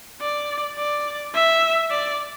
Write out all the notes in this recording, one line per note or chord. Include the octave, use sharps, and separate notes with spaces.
D5
D5
E5
D5